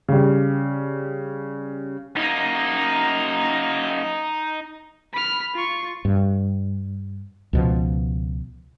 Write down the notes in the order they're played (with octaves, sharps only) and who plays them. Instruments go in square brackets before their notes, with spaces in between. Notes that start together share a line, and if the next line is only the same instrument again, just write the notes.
[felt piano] C#3 G3
[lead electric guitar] F#2 A#3 [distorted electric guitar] D#4
[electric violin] B5 F6
F4 C#6
[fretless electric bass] G2
C#2 B2 F3